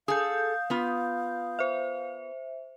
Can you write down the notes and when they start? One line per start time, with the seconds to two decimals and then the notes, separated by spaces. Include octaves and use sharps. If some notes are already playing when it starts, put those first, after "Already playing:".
0.08 G#4 A4 F5 D#6 G6
0.70 B3 F4
1.59 C5 E5